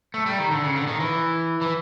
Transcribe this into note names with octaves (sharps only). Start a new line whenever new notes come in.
A3
G3
D#3
D3
C#3
D3
D#3
E3
E3